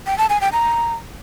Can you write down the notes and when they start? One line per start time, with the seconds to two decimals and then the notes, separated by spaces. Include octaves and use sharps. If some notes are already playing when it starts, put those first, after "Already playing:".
0.07 G5
0.18 A5
0.30 G#5
0.41 G5
0.53 A#5